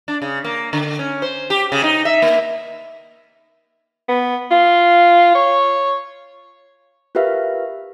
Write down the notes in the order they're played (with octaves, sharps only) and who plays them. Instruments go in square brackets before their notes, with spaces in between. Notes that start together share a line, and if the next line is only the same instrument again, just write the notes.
[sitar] D4
C#3
A#3
D3
C#4
C5
G4
C#3
D#4
E5
A#3
[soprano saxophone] B3
F4
C#5
[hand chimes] F4 G4 A#4 B4 E5 F5